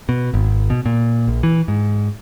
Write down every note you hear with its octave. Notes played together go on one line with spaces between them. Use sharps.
B2
G#1
B2
A#2
A#1
E3
G#2